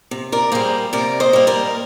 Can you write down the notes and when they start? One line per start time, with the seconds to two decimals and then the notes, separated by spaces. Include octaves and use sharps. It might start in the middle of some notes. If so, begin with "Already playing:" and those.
0.11 C3
0.32 A#4 D5
0.52 G3 A#3 G#4 C5
0.93 C3 A#4 D5
1.20 C5 D#5
1.33 G3 A#3
1.47 A#4 D5